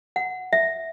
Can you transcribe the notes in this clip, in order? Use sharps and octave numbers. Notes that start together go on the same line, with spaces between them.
F#5
E5